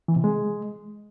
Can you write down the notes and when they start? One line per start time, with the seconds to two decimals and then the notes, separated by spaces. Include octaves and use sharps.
0.08 E3
0.16 C3
0.24 G#3